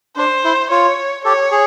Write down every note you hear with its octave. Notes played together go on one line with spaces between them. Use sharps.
D4 C5
E4
F4 C#5
G4 A4 C#5
G#4